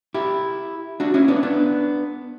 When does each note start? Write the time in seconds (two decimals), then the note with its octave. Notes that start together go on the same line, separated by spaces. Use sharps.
0.14 E4 G4
1.00 D4 F#4
1.14 C#4 E4
1.28 B3 D4
1.43 B3 D4